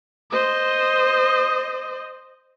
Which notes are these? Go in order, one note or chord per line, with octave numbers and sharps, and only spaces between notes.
C5 D#5